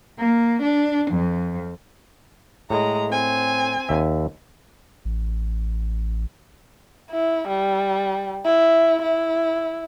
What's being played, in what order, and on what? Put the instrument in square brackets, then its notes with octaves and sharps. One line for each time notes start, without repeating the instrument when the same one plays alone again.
[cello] A#3
D4
F2
[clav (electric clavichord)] A2 [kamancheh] G#3 A#5
[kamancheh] C4 G#5
[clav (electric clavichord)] D#2 E5
[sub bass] A1
[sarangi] E4
G3
E4
E4